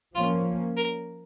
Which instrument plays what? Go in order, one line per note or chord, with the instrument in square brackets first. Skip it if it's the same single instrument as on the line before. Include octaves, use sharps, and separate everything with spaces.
[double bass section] F3 A#3 C#4 [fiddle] F4
[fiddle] A#4